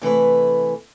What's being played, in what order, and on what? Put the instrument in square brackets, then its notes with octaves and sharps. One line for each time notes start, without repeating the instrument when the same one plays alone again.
[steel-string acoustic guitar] C3 E3 A3 B4